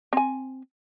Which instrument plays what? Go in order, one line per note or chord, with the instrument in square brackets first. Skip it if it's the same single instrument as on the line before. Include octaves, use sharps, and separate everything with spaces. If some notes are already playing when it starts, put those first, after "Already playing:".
[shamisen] C4 G#5